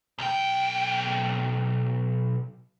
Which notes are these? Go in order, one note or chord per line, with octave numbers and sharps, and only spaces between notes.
B1 G5